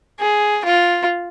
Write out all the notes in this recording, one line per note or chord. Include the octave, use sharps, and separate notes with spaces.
G#4
F4